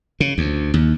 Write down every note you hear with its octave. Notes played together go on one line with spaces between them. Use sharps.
C#3
D2
D#2